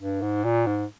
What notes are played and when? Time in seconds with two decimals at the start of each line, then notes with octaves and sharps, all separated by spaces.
0.01 G2
0.22 G#2
0.44 A#2
0.67 G#2